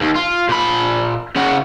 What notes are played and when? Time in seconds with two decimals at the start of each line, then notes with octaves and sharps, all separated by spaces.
0.01 D#2
0.15 F4
0.49 A#2 B5
1.36 C#3 F#4